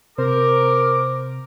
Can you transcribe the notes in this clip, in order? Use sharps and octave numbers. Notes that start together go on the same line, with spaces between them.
C3 A#4 C5 D6